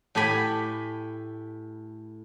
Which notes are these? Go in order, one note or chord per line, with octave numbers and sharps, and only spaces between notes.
A2 G4 A4 G#5 B5